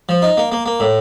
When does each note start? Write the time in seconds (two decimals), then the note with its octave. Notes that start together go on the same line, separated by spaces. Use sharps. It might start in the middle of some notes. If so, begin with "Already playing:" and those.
0.09 F3
0.22 D#4
0.37 A#3
0.52 A#3
0.66 A#3
0.80 A2